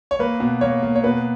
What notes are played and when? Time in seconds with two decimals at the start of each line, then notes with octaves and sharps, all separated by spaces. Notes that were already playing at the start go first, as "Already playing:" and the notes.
0.11 C#5
0.19 A#3 B4
0.40 B2
0.61 A#3 C#5
0.82 A#3
0.96 C#5
1.04 B2 B4